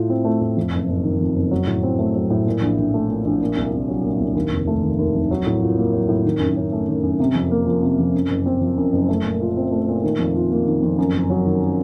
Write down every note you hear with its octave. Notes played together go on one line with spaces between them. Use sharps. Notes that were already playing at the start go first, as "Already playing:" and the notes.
Already playing: A2 A3 F4
C4
A3
A2
F2
F#1
F#1
D#3
F2
F#1
F#3
A2
C4
A3
F#3
A2
A#2
A#1
A#1
A3
A#2
A#1
A#2
C2
C2
F#3
A#2
C2
D#2
F1
A3
D#3
D#2
F1
F#3
A2
F4
A#3
F#3
A2
D#3
F#2
C#4
A3
D#3
F#2
C3
F2
A#3
F3
C3
F2
F#2
F#1
C4
F3
F#2
F#1
A3
A#2
F4
C4
A3
A#2
D#3
F2
F4
A#3
D#3
F2
F#2
F#1
F#3
D#3